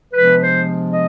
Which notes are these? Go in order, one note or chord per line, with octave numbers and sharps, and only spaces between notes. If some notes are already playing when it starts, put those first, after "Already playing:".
C3 F3 G#3 B3 D4 B4
C5
D#5